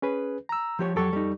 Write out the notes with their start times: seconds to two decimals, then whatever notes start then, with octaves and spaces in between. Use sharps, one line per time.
0.02 C#4 G#4 B4
0.49 A#5 E6
0.79 F3 G4 C#5
0.96 F2 F#3 G4 A4 C#6
1.13 G3 D#4